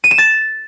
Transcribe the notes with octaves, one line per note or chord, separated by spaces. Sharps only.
D#7
E7
A6